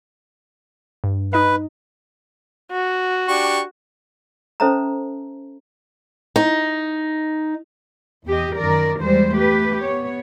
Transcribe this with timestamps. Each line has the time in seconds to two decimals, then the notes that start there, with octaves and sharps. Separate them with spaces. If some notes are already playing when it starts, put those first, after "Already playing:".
1.04 G2
1.33 D#4 B4 D#5
2.72 F#4
3.28 D4 G4 C#6
4.60 C#4 A4 C5 E5 A5 A#5
6.36 D#4
8.27 E2 G4 D#5
8.56 F#2 D#3 A#4 D5
9.01 E2 G3 G#3 C5
9.35 A3 G4 B4
9.83 B3 C#5